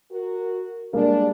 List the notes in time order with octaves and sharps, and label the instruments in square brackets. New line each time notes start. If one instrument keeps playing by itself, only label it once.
[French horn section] F#4 A#4
[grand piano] G3 G#3 A#3 [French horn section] D4